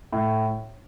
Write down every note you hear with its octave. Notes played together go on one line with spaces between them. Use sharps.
A2